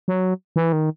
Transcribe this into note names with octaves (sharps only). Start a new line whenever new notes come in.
F#3
E3
D#3